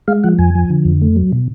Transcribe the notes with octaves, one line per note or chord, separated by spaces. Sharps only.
G#3 F5
F3 F#5
F2 G#5
F3
D3
F2
A3
F#3
B2